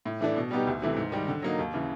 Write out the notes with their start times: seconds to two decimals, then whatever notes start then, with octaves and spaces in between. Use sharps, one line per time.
0.06 A2
0.21 E3 A3 D4
0.36 B2
0.51 G3 B3 D#4 G4
0.67 D2
0.82 C3 E3 A3
0.96 G#2
1.12 D#3 G3
1.28 D3
1.42 F#3 A#3 D#4
1.59 D#2
1.74 C#3 E3